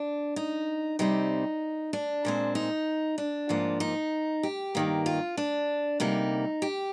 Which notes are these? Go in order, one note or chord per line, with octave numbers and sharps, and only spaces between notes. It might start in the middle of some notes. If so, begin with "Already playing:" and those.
Already playing: D4
D#4
C3 G3 C4 D#4
D4
A#2 G#3 C4
D#4
D4
G#2 F3 A#3
D#4
G4
G2 D#3 A#3
F4
D4
D2 C3 G3 A#3 D#4
G4